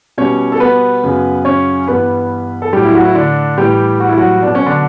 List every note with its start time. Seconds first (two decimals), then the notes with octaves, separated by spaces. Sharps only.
0.18 B2 G3 C#4 C#5
0.52 A4
0.60 B3 B4
1.03 F#2 C#3 F#3
1.45 C#4 C#5
1.87 G2 E3 G3 B3 B4
2.62 A4
2.72 A2 F#3 G3 G4
2.85 E4
2.94 F#3 F#4
3.05 E4
3.15 D3 D4
3.57 A2 E3 G3 G4
4.00 F#4
4.09 E4
4.18 F#3 F#4
4.42 B2 F#3 D4
4.55 C#4
4.66 D3 D4